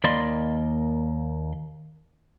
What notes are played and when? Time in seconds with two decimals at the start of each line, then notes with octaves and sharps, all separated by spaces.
0.04 D#2 A#3 D5 D#5 B5 C6